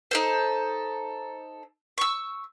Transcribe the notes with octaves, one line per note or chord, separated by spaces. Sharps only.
D#4 A4 C5
C#6 E6